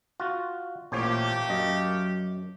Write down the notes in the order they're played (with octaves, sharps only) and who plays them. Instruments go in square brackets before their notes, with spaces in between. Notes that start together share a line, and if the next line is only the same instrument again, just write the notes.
[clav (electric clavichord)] F4 F#4
[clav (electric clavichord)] A1 C5 C#5 [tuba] A#2 [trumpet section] A3 A#3 G4
[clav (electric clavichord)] F#2 D#5 [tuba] F#3